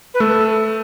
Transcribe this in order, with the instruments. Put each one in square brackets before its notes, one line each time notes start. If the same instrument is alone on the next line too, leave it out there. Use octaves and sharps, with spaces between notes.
[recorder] B4
[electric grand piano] A3 [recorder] A4